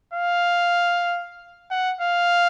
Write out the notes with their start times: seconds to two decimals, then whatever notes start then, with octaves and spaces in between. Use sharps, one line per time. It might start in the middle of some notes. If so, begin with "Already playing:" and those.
0.14 F5
1.71 F#5
2.01 F5